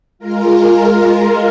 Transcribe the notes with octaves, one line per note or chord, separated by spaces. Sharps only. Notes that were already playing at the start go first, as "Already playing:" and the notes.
G#3 F4 A#4